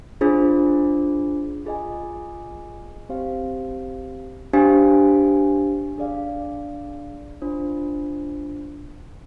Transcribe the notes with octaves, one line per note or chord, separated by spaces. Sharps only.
D4 F4 G#4 C5
F4 G#4 D#5 G#5
C4 G4 C5 F5
D4 G4 C5 F5 G#5
D4 G#4 D5 F5
D4 F4 C5